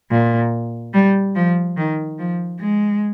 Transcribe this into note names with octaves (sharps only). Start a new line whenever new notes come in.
A#2
G3
F3
D#3
F3
G#3